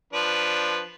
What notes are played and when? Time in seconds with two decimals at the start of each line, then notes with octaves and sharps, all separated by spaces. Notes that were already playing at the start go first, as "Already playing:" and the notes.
0.13 F3 D4 B4